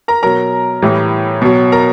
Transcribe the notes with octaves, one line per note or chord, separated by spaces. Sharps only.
A#4 A#5
B2 F#3 A#4 A#5
A2 E3 G3
B2 F#3
A#4 A#5